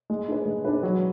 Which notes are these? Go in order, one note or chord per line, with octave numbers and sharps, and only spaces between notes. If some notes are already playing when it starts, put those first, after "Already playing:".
G#3
D4 G#4 B4
G#3
D4 G#4 B4
F#3